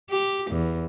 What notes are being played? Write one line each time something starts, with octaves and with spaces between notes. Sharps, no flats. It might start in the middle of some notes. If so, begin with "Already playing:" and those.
G4
E2